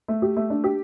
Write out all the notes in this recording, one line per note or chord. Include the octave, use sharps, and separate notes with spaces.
A3
G4
A3
D4
G4